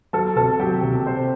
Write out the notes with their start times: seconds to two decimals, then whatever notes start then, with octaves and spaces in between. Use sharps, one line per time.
0.13 F#3 A4 A5
0.36 C3 A4 A5
0.59 F#3 G4 G5
0.83 C3
1.06 C5